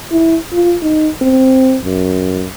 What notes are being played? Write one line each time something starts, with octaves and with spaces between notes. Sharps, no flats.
E4
F4
D#4
C4
F#2